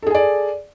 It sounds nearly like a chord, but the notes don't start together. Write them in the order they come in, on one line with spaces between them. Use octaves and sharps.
A4 G#4 G#5 D5